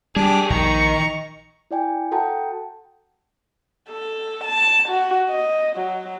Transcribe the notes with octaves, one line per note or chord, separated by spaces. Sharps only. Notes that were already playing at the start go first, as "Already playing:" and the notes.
G3 D4 G4 G#4 D6
A#1 D#3 A#5 C#6
E4 D5 G5 G#5
F#4 A4 F#5 G5 A5 A#5
A4
A5
F#4
D#5
F#3